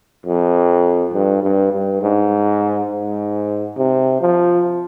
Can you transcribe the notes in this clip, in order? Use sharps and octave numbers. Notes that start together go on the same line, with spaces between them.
F2
G2
G2
G2
G#2
G#2
C3
F3